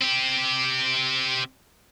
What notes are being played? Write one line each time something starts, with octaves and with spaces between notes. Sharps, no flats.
C4 G4